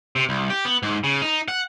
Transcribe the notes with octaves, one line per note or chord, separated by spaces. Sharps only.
C3
C2
G4
B3
G#2
C#3
D#4
F#5